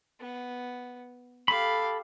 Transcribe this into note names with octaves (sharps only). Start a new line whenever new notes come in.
B3
G4 A4 F5 B5